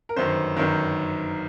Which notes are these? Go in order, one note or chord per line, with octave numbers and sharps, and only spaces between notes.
A#4
G1 F#2 D#3 C5
G1 F#2 D#3 A#4